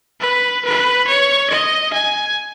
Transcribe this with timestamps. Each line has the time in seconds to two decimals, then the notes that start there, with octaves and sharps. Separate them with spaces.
0.21 B4
0.65 B4
1.07 C#5
1.50 D#5
1.93 G#5